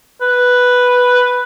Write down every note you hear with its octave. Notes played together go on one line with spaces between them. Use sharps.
B4